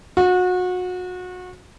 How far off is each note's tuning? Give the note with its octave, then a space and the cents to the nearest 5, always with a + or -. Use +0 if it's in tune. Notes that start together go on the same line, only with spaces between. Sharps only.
F#4 -30